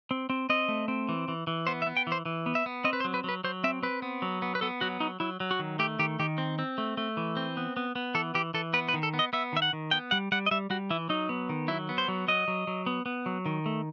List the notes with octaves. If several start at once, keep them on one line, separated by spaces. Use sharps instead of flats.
C4
C4
C4 D#5
A3
C4
E3
E3
E3
B3 C5
E5
B3
G5
E3
C5
E3
B3
E5
B3
C4 D#5
B4
C5
F#3
B4
F#3 B4
F#3 C5
C4 E5
C4 B4
B3
F#3
B3
B4
B3 A4
F#3 F#4
F#3 D#4
F#3 E4
F#3
F#4
D#3
A3 G4
D#3 G4
D#3 G4
C4
C4
A3
A3
E3
C4
B3
B3
B3
E3 A4
E3 G4
E3 A4
B3 B4
B4
D#3
A4
B3
D#5
B3 E5
D#3 E5
F#5
D#3
B3 G5
G3 F#5
G3 F#5
D#5
G3 E5
G3 F#4
E3 E4
F#3 D#4
B3
D#3
F#3 E4
B3
C5
F#3
F#3 D#5
F#3
F#3
B3
B3
F#3
D#3
A3